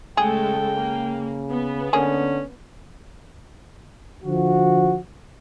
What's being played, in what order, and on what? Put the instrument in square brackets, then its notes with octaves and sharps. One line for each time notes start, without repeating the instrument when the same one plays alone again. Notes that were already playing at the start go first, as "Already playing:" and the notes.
[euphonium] C#3 [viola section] G#3 A3 A4 [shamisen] G#4 [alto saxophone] G5
[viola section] A#3
B3
[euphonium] D3 [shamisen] A#3 G#4 [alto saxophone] C#4
[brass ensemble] D3 F3 F#4